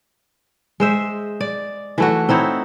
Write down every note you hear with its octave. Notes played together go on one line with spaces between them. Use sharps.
G#3 C5 E5
D5
E3 A3 F#4
C4 D#4 E4 C#5